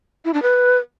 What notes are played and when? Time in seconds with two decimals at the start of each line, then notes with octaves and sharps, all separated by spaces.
0.25 E4
0.34 D4
0.42 B4